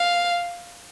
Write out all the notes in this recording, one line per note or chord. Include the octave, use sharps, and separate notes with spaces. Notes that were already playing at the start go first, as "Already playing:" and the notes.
Already playing: F5